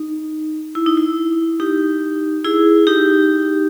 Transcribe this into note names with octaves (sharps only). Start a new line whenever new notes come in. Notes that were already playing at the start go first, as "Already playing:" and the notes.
Already playing: D#4
E4
D#4
E4
D#4 G4
E4 G#4
D#4 G4